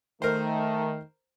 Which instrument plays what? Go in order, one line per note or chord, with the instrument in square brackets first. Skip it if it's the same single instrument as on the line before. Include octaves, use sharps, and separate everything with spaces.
[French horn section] D#3 [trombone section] A3 [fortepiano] A#4 C5